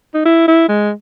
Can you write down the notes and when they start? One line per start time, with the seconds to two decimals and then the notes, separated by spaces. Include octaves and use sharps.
0.14 D#4
0.25 E4
0.48 E4
0.69 G#3